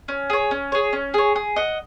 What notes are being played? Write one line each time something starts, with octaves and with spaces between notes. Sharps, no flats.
C#4
G#4 C#5
C#4
G#4 C#5
C#4
G#4 C#5
G#4
D#5 F#5